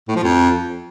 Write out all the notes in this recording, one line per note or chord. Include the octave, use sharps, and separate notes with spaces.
A2
F3
F2